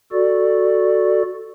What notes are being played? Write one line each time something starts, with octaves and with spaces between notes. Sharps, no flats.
F#4 A4 D5